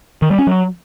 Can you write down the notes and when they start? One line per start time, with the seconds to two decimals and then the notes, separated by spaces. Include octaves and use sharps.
0.22 D#3
0.30 G3
0.39 C#4
0.47 F#3